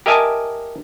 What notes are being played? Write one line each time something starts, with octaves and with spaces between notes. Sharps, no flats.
G4 A#4 D#5 E5 G#5 A5